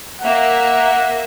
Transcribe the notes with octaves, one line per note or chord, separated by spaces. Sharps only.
A#3 E5 F#5